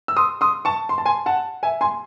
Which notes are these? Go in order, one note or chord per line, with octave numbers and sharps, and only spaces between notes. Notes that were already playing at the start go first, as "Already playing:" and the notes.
E6
C6 D#6
C6 D#6
A5 C#6
C6
A5
G#5 C6
F#5 A5
E5 G#5
G#5 C6